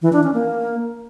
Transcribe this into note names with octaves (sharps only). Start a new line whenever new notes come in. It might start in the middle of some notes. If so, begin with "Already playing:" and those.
E3
D4
C#4
A#3